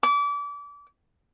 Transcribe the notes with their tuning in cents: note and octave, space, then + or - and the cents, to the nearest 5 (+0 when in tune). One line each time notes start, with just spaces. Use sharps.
D6 -30